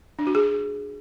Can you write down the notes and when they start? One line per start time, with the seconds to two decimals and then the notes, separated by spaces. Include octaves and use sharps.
0.19 D4
0.27 F#4
0.35 G#4